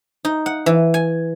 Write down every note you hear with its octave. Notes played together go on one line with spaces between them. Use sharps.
D#4
F#5
E3
G#5